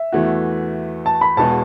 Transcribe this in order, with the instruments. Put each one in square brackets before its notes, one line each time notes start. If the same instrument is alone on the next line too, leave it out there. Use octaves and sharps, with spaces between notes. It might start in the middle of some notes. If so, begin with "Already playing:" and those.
Already playing: [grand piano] E5
[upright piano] E2 E3 A3 F#4
[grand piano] A5
B5
[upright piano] E1 E2 B2 B3 [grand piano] A5